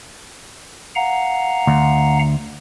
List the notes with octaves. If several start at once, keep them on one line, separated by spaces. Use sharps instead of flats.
F5 F#5 A#5
D2